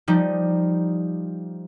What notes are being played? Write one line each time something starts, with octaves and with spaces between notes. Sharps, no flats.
F3 G3 D#4